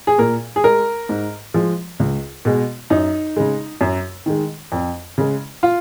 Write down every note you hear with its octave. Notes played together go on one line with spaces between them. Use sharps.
G#4
A#2 A#4
G#4
G#3 A#4
G#2
F3 G#3
C#2
B2 G#3
F#2 D#4
C#3 G#3
F#2
D#3 G#3
F2
C#3 G#3
F4